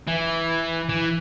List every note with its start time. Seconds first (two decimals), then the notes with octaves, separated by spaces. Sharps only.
0.07 E3
0.89 E3